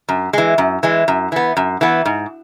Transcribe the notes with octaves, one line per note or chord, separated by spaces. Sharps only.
F#2
E3 G#3
F#2
E3 G#3
F#2
E3 B3
F#2
E3 B3
G#2